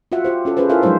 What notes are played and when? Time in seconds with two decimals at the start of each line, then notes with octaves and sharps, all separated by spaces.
0.12 F4 F#4 E5 F#5
0.25 F4 G4 C5
0.45 C#4 F4 A4
0.57 C#4 G#4 A4 B4 C5
0.69 E4 F4 A4 A#4 E5 F5
0.82 F3 F#3 G#3 D#4 C5 E5